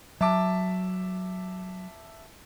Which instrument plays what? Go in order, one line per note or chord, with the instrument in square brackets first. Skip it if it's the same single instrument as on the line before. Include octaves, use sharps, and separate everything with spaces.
[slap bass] F#3 [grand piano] E5 A5 D6